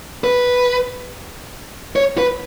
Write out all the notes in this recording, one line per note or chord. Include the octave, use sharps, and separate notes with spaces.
B4
C#5
B4